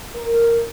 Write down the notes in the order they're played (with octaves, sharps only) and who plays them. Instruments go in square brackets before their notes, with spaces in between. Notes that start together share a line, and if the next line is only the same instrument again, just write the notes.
[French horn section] A#4